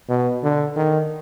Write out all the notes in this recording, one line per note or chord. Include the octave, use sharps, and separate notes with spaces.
B2
D3
D#3